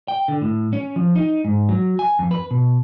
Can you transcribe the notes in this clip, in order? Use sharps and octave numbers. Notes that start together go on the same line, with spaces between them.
G5
D3
A2
C#4
F3
D#4
G#2
F#3
G#5
F2
B4
B2